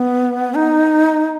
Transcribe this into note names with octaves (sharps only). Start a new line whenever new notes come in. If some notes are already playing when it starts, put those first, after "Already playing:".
Already playing: B3
D#4